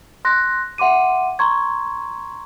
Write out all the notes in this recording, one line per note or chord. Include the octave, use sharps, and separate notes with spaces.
C6 F#6 A#6
E5 F#5 C6 D6 D#7
A#5 C6 C#6 G#6